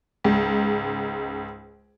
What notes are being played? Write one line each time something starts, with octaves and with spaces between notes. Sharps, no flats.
C#2 G#2